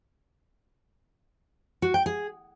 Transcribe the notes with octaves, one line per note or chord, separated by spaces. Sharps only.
F#4
G5
G#4